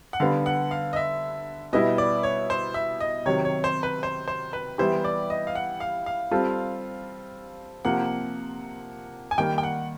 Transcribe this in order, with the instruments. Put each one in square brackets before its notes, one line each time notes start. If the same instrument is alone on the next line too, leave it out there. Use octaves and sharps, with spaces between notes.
[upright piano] F#5
[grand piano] D3 G3 B3 [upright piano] F5
[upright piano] F#5
F5
D#5
E5
[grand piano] B2 G3 B3 E4 [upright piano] D#5
[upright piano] D5
C#5
C5
E5
D#5
[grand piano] C3 D#3 F#3 [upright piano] C#5
[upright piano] C#5
C5
B4
C5
C5
B4
[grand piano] E3 G3 B3 E4 G4 [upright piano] C5
[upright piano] D5
D#5
F5
F#5
F5
F5
[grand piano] G3 C4 F4 A4
[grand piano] C3 F3 A#3 [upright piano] F#5
[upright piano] G#5
[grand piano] D#3 G3 A#3 [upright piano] G5
[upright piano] G5
F#5